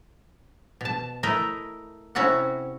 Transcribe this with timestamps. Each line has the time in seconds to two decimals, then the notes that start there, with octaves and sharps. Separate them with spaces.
0.81 B2 A5
1.23 A3 E4 A#4 D#5
2.15 C3 C#4 E4 F#4 A4 F#5